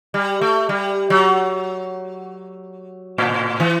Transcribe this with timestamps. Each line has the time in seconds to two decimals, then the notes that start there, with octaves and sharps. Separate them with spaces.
0.14 G3
0.41 A3
0.69 G3
1.10 F#3
3.18 A2
3.60 E3